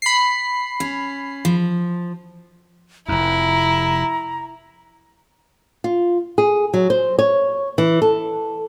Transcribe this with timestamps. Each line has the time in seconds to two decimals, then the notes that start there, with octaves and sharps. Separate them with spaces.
0.02 B5 C7
0.80 C#4
1.45 F3
3.08 F1 F2 E4 A#5
5.84 F4
6.38 G#4
6.74 F#3
6.90 C5
7.19 C#5
7.78 E3
8.02 A4